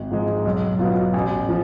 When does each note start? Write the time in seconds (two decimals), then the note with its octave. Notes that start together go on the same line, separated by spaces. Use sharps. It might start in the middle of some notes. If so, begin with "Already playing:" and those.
Already playing: G#1
0.11 G#2 F3 G#3
0.45 B1
0.79 B2 F#3 B3 F4
1.14 A1
1.49 F3